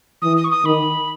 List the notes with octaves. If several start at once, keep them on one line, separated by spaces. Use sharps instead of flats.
E3 D#6
D#6
C#6
D#6
D#3 B5